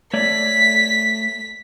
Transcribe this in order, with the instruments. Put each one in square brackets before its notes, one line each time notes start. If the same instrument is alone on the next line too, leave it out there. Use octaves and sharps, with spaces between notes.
[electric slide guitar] A3 C#5 D5 [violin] B6